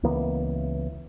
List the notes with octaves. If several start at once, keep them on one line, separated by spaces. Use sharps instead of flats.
C#2 E3 A#3 B3